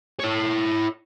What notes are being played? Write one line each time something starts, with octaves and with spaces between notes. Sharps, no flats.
E4 C#5